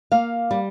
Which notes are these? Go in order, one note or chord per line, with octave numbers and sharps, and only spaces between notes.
A#3 F5
G3